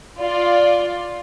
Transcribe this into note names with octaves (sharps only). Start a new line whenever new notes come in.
F4 D5